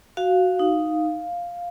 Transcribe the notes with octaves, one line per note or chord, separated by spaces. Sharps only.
F#4 F5
D#4